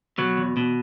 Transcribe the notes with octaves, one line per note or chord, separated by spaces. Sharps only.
B2 F#3
E2
B2